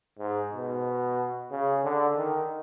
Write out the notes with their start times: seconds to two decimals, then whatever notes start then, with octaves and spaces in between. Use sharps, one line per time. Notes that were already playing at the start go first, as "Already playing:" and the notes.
0.19 G#2
0.52 B2
1.51 C#3
1.84 D3
2.17 D#3